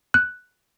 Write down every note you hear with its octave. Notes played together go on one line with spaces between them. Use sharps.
F#6